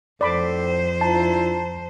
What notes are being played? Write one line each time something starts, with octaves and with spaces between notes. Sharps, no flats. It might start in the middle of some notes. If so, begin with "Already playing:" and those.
F2 A2 C4 A4 C5 D5 B5 D6
D4 E4 F4 A5 A#5